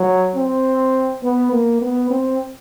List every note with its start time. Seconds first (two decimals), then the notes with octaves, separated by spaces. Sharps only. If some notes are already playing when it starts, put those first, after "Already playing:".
Already playing: F#3
0.35 C4
1.23 B3
1.53 A#3
1.81 B3
2.10 C4